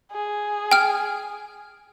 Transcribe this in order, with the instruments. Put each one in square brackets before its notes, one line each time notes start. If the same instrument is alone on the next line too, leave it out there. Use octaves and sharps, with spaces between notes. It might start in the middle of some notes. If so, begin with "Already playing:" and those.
[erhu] G#4
[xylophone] G5 F6